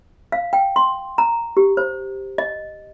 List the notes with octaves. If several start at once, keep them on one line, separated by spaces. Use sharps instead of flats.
F5
G5
C6
A#5
G4
C5
D#5